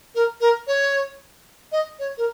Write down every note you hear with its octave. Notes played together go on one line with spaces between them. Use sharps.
A#4
A#4
C#5
D#5
C#5
A#4